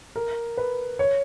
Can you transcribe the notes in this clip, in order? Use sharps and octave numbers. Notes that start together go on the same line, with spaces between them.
A#4
B4
C#5